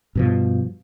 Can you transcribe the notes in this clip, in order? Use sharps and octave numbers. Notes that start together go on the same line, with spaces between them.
G2 B2 F3